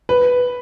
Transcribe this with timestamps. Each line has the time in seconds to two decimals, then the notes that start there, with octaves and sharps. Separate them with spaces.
0.09 B4